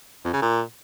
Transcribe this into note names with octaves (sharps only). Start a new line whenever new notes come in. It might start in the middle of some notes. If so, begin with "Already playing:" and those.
F2
C#3
A#2